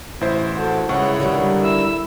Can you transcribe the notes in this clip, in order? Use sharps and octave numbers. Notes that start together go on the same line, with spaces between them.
A1 E4 C5
F#4 A4
C#2 G#3 E4 C#5 F#5 C#6
D3 D#3 G3
E4 E6